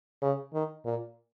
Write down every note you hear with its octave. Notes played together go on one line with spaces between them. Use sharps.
C#3
D#3
A#2